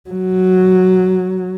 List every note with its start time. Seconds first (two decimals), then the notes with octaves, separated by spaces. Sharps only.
0.10 F#3